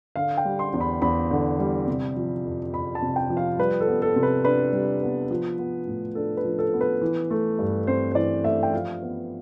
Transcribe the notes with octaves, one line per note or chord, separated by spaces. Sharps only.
D3 F5
G5
G3
C6
E2
B5
E2 B5
D3
G3
C3
F3
F2
F2 B5
A5
C3
G5
F3
F5
G3 B4
A4
B3
A4
C3
B4
D4 B4
G3
B3
F3
B3
A2
D4 A4
B4
F3
A4
B3
B4
E3
A3
G2
C4 C5
C5
E3 D5
A3 E5
G5
F3 F5
B3